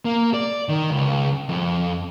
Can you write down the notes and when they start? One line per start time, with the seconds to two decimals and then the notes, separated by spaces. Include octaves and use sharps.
0.05 A#3
0.34 D5
0.69 D#3
0.91 C#2
1.49 F2